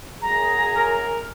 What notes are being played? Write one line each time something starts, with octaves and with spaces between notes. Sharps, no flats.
F#2 G#4 A#5
A#4